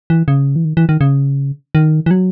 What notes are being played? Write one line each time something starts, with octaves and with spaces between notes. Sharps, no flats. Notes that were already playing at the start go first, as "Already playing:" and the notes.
E3
C#3
E3
D#3
E3
D#3
C#3
D#3
E3
F#3